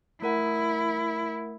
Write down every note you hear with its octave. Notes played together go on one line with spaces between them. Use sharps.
A3 E4 A#4 F#5